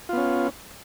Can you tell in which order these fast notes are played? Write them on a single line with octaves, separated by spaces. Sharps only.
F4 B3 C#4